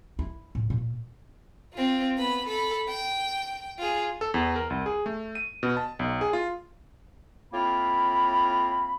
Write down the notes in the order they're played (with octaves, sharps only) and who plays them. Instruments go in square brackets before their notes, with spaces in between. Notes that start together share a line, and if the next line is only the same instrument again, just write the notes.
[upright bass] E4
A2
A#2
[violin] C4 F4
B3 B5
A4 B5
G5
F4 G#4
[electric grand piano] A4
E2
A#4
C2
G#4
A3
D#7
B2
A5
B1
G#4
F4
[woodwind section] A2 A#3 C4 F4 B5